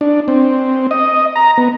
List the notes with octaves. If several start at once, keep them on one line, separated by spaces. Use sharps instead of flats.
D4
C4
D#5
A#5
B3